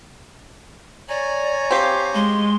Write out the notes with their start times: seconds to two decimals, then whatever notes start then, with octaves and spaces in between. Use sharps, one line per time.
1.09 C#5 D5 G#5 A#5
1.71 C4 G4 F5
2.14 G#3 C6